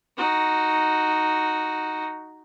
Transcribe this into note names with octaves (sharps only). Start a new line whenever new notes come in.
D#4 F#4